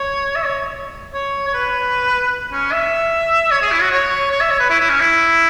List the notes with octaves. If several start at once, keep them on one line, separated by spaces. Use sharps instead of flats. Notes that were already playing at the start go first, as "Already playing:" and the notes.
Already playing: C#5
E5
C#5
C#5
C#5
B4
C#4
E5
C#5
G#4
E4
F#4
C#5
C#5
E5
C#5
B4
E4
E4
C#4
E4